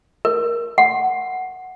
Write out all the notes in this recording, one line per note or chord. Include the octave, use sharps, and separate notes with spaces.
A#4
F#5